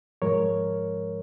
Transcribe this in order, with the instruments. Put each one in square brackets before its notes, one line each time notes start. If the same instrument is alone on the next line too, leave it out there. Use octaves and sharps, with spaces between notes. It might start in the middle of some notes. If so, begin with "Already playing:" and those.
[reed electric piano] G#2 F3 G#3 A#4 C#5